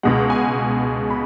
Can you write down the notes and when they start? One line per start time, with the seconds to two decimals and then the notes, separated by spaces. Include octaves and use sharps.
0.03 C#2 B2 G#3 F#5
0.30 G#5
1.10 B5